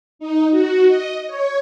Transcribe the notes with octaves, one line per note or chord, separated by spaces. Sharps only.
D#4
F#4
D#5
C#5